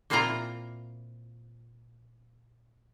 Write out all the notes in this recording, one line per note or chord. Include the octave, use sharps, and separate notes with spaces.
A#2 A#3 C4 E4 F4 A#5